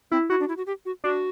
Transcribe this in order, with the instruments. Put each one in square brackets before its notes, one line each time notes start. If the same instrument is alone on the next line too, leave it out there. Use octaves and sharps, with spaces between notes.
[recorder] C4 [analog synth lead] E4
[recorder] E4 [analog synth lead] F#4
[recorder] D4
E4
F#4
G4
F#4
[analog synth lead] D4 [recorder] F#4